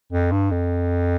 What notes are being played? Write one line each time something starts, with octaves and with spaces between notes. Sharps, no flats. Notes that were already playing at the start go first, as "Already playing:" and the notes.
F2
G2
F2